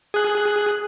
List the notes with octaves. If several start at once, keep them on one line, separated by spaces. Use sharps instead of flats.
G#4 F#6